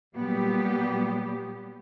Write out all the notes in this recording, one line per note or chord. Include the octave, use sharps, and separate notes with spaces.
A#2 F#3 G3 B3 G4